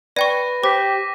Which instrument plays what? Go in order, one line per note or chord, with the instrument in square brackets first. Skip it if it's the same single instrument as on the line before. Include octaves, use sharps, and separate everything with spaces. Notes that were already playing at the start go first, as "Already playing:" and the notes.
[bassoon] B4 [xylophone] D5 G5 C#6 [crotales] A#6 D#7
[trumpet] G4 [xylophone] C5 [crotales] D6 B6